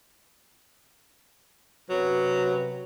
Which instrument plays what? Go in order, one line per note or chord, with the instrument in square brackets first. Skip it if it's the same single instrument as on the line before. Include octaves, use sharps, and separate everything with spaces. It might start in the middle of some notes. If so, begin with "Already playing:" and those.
[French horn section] F#2 C3 B4 [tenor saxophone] F#3